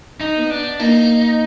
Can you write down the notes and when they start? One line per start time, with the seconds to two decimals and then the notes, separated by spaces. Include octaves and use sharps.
0.21 D#4
0.35 B3
0.50 D4
0.79 A#3 D#4